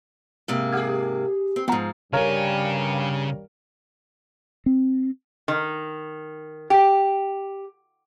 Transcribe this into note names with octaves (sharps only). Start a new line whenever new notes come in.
G#2 C3 A#3
G4 G#4 F#5 F6 G#6
C4
G#2 F3 B3 F#5 A#5
G2 C#3 G3 A#4 C#5 F5 G#5
C4
D#3
G4